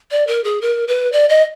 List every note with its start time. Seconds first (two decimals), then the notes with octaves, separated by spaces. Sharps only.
0.11 D5
0.27 A#4
0.44 G#4
0.62 A#4
0.88 B4
1.12 D5
1.29 D#5